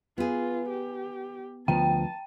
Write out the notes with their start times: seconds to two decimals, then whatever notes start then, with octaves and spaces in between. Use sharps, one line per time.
0.18 B3 F4 G#4
0.69 G4
1.68 D2 F3 B3 G5 A5